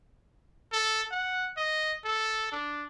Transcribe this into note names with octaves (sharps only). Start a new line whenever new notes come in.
A4
F#5
D#5
A4
D4